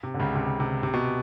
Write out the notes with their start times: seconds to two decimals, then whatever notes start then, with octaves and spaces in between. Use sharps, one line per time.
0.03 C3
0.14 D3
0.19 C#2 C#3
0.35 C3
0.60 C3
0.83 C3
0.94 B2